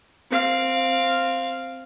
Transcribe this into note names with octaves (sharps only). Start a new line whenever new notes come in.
C4 F5